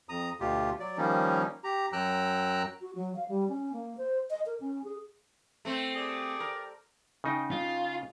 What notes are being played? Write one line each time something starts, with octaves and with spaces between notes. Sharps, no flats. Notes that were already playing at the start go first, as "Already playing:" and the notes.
F2 A#5 D#6
D2 B2 F4 G4
F#3 D5
D#3 F3 G3 A#3 C#4 D#4
G4 A#5
F#2 F#3 G5 A#5 E6 F#6
F#4
F#3
F5
G3
C#4
A#3
C5
D#5
A#4
C#4
G#4
A3 C4
G4 G#4 D5
A#4
C#3 D#4 G5
F4